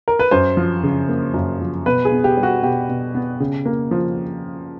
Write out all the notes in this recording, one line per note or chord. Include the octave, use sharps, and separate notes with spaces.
A#4
B4
F#2 C5
F3
C#3
A#3
F#2
F3
B2 B4
G#4
B3
G4
G3
F#4
B2 G4
B2
B3
C#3
A#3
F3